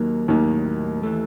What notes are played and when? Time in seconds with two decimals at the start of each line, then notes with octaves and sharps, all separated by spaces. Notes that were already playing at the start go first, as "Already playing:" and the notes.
Already playing: D#2 D#3 F#3 A#3
0.28 D#2 A2 D#3 F#3 A#3
1.03 E3 A3